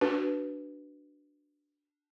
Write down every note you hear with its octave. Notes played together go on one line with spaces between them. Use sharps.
D4 F#4 B4